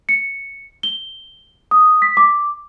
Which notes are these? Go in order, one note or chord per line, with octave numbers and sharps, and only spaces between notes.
C#7
G7
D#6
B6
D6